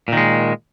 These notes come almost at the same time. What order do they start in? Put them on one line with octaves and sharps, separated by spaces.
A#2 D#3 G#3